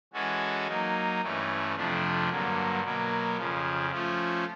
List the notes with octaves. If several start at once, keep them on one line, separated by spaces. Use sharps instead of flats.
E3 G#3 C#4 F#4 A4
F#3 A#3 D#4
G2 E3 A3 C#4
F2 C3 F3 A3 D4
G2 D3 F#3 A#3
B2 F#3 A#3
F2 C#3 F3
F3 A3 C#4 F4